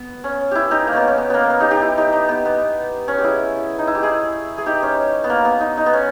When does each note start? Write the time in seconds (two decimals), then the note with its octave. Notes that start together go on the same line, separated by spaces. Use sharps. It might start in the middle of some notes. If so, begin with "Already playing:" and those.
Already playing: B3
0.24 C#4
0.51 E4 G4
0.71 D#4 G4
0.87 A#3
0.93 B3 C#4
1.08 C#4
1.18 B3
1.30 A#3 B3
1.44 A#3
1.50 B3
1.60 D#4 G4
1.71 D#4 G4
1.82 E4
1.97 D#4 G4
2.13 D#4
2.29 B3
2.45 B3
3.08 C#4
3.18 G4
3.24 E4 G#4
3.79 D#4
3.87 E4
3.95 G4
4.03 E4 G#4
4.58 G#4
4.66 D#4 G4
4.82 C#4
5.24 B3
5.30 A#3
5.45 B3
5.61 D#4
5.77 D#4
5.86 B3
5.93 C#4